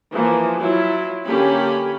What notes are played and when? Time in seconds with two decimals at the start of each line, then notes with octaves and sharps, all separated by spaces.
0.14 E3 F3 A#3
0.61 F#3 E4 F4
1.25 D3 A#3 C#4 G4 B5